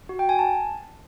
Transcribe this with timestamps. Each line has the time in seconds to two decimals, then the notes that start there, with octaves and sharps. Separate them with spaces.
0.09 F#4
0.19 G5
0.29 G#5
0.39 A5